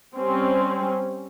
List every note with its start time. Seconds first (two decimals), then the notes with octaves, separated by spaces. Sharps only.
0.16 G3 C4 C#4